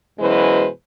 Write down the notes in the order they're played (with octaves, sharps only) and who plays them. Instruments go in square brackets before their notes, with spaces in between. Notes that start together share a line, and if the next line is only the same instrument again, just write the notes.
[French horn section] F#2 B2 E3 G#3 B4 C5